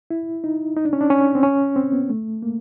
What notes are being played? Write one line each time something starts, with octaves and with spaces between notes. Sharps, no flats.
E4
D#4
D#4
D4
C#4
D4
C#4
C4
C#4
C4
B3
A3
A#3